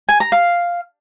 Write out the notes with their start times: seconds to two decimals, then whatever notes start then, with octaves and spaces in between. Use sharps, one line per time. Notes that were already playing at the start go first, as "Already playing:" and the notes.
0.09 G#5
0.20 A#5
0.32 F5